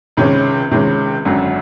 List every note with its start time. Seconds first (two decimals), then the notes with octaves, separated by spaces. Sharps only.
0.17 C#2 C3 D#3 G#3 C#4
0.71 C#2 C3 D#3 G#3 C#4
1.25 G#1 F#2 D3 F#3